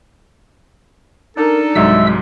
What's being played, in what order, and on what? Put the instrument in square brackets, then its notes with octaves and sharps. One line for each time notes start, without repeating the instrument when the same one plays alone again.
[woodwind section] D4 D#4 A4 [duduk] A#4
[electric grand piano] C2 G#2 F#3 [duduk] G#3 [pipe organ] E5 E6